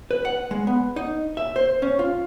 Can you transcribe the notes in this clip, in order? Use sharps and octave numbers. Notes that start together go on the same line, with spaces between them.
B4
F#5
G#3
B3
D#4
E5
C5
C#4
F4